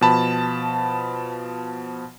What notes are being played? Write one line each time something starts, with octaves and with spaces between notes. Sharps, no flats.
B2 F3 A5 B5